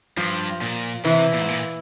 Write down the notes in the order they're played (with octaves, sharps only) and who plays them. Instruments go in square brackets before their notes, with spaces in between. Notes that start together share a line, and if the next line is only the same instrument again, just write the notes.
[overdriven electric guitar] G2 [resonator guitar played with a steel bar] F3
[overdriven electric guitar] A#2
[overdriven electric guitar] C3 [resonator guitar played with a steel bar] E3
[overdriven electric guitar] A#2
G#2
A#2